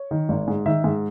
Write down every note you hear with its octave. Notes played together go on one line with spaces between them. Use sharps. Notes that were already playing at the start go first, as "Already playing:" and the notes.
Already playing: C#5
D#3
G#1
G#2
D#3 E5
G#2